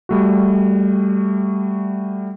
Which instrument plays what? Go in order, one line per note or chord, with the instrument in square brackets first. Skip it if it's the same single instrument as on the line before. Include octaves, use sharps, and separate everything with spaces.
[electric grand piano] G3 A3 F#4